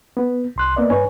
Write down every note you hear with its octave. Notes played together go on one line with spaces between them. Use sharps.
B3
C2 C6 F#6
A#3 B3 D5 D#5
G2 D4 B4 C#5 G#5